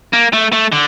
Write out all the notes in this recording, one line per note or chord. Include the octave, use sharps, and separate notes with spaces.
A#3
A3
A3
D3